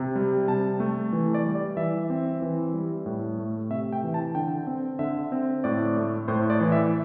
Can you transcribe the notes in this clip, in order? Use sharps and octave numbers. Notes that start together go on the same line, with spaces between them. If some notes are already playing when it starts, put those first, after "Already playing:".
Already playing: C3
G3
C3 A5
A3
E3
D5
G3
D5
E3 E5
C4
E3
G3
A2
A3
C3 E5
G5
E3
A5
D3 G5
C4
D3 E5
C4
A2 D5
A3
A2 C5
D5
E3
E5